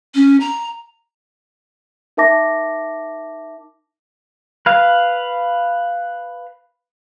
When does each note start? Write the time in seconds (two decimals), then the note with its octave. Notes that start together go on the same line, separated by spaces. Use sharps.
0.15 C#4
0.41 A#5
2.17 D#4 A#4 E5 A5 D6 A#6
4.66 B4 F5